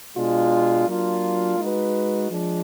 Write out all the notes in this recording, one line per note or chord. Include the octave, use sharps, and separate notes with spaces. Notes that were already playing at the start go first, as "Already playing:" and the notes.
B2 G#3 D4 F4
F#3 A#3 D4 F4
G#3 D#4 F#4 B4
F3 G#3 D4